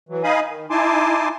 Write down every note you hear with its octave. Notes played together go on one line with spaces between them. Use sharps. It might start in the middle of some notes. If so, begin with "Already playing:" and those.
E3 F#3
D#4 D#5 F5 G#5 B5 D#6
D#3
D#4 E4 G#5 A5 C6 D6